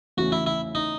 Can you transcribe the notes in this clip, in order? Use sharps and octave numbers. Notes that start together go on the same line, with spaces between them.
E2 C#3 E3 A3 F#4
E4
E4
D#4